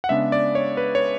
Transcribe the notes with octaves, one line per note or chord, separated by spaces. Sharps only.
F#5
C#3 G#3 B3 D4 E5
D5
C#5
B4
C#5